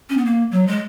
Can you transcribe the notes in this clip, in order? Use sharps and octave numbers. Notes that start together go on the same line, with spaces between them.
C#4
B3
A#3
F#3
G#3